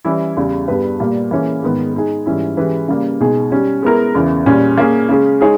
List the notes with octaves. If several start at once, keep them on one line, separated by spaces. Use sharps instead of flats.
E3 G3 C#4 E4
E2 C#3 G3
G2 G3 B3 G4 B4
A#2 G3 A#3
E3 A#3 C#4 G#4 C#5
G#2 D#3 G#3 B3
G#3 D#4 G#4
G#2 E3 G3 C#4 E4
E3 G#3 C#4 G4 B4
C#3 G3 A#3
B2 G#3 D#4 G#4
G3 C#4 G4
G#3 B3 E4 A#4
E2 C#3 E3
A#2 G3 C#4
A#3 C#4 G#4
C#3 G#3 C#4 G#4
G#3 D#4 G#4 C#5